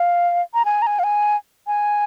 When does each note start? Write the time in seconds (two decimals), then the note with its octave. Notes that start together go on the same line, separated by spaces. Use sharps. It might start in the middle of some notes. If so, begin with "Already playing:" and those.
Already playing: F5
0.54 A#5
0.65 G#5
0.82 A#5
0.87 G#5
0.99 F5
1.04 G#5
1.67 G#5